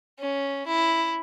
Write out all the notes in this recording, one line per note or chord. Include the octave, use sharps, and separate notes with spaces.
C#4
E4